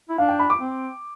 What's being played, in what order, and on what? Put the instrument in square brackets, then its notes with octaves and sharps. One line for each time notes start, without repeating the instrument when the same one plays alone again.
[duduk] E4
[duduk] D4 [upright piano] F5
[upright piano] G5
B5
D6
[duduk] C4